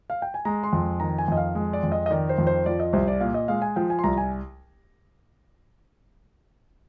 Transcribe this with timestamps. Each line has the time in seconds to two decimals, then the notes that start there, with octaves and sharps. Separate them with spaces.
0.10 F5
0.22 G5
0.34 G#5
0.45 G#3 A#5
0.64 C6
0.73 F2
1.00 D#3 A#5
1.18 G#5
1.28 F2 D#5
1.37 F5
1.55 G#3
1.73 D5
1.83 F2
1.92 D#5
2.06 D#5
2.11 D#3 D5
2.29 C5
2.38 F2
2.47 C5
2.66 F3 D5
2.80 D#5
2.93 C2 C5
3.08 D5
3.21 A#2 F5
3.34 D#5
3.48 G#3 F5
3.62 G#5
3.76 F3 G5
3.90 G#5
3.99 C6
4.04 C2 A#5
4.18 G#5